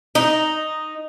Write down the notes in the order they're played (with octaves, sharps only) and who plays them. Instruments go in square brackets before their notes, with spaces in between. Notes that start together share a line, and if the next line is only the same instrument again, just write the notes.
[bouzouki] D#4